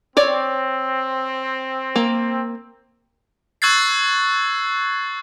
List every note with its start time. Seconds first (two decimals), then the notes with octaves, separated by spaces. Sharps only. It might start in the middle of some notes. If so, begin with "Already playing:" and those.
0.17 C4 C#5 D5
1.96 A#3
3.62 C#6 E6 F#6 G#6 A6 C7